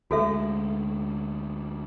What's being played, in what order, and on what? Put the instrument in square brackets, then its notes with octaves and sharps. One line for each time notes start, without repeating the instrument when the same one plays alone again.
[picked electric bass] D2 G#3 [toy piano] F#4 A4 E5